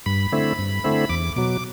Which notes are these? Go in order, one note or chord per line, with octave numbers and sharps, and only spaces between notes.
G2 B5
D3 A3 C4 E4
G2
D3 A3 C4 E4
E2 D6
B2 F#3 D6